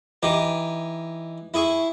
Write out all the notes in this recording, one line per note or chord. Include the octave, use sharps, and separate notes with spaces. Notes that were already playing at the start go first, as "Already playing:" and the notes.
E3 D#4 G4
E4 G#4 C#6